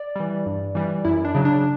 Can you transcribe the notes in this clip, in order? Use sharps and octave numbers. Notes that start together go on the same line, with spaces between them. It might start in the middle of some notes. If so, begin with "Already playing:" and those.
Already playing: D5
E3 G3
G2
E3 G3
F#2 E4
D4
C#3 F#3
D4